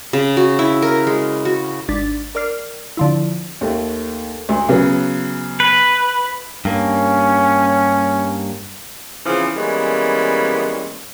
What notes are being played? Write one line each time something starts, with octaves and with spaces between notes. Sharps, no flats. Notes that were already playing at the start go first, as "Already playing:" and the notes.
C#3
F#4
E4
A#4
G#3
F#4
G#1 D4 A6 B6
A#4 D5 F6 C7
D3 F3 E4
D#2 A3
D2
C#3 F#3 B3
B4
G2 A#3 C#4
C#3 E3 F3 B3 C4
E3 G3 G#3 A#3 B3 C#4